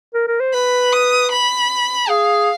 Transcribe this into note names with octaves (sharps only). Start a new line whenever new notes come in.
A#4
A#4
C5
B4 B5
D#6
B5
G#4 F5